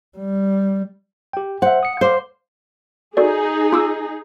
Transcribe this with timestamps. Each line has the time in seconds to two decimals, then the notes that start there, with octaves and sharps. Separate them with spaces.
0.18 G3
1.33 G4 G5
1.62 C5 E5 F#5
1.83 D#6 C#7
2.01 C5 F5 D6
3.17 D#4 F#4 G#4 A4 D5
3.73 F4 D6 E6